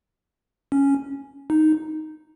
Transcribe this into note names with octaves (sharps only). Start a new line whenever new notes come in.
C#4
D#4